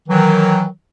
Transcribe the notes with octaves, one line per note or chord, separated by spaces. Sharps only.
D#3 E3 F#3